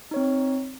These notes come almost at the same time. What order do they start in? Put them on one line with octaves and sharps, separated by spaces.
D#4 C#5 C4